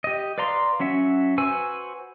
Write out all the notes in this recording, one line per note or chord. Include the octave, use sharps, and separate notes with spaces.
G4 D#5
B4 D5 F5 A#5 C6
F#3 C#4 E5 F#5
F#4 B4 C5 G#5 E6